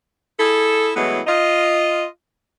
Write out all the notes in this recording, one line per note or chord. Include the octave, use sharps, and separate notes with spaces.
E4 G#4 A4
A2 E3 F#3 G#3 B3
F4 D#5